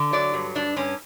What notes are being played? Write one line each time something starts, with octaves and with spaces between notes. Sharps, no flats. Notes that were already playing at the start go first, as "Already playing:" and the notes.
Already playing: D3
F#3 D5
G2
G2 D4
G2 C#4